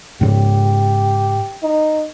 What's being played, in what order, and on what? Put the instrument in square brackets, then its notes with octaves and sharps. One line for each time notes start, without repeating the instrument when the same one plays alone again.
[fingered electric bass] G#2 C#3 [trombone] G4
[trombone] D#4